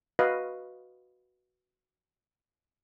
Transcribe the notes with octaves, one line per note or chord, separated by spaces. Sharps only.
F#4 B4 D#5 F5